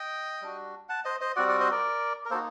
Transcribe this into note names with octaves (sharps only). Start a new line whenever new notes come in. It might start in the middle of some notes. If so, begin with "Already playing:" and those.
Already playing: D#5 G5
G3 D4 F#4
F#5 A5
C5 D#5
C5 D#5
G3 C4 F#4 D5 F#5
D5 F#5
C5 D#5
A#4 D5
A#4
A#3 D#4 F#4 A4 C5